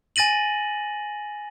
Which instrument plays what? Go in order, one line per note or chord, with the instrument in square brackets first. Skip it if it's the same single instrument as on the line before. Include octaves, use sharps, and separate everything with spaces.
[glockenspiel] G#5 A6 A#6 D#7 F#7